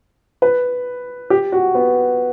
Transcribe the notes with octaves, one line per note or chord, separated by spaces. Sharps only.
B4
G4
F#4
B3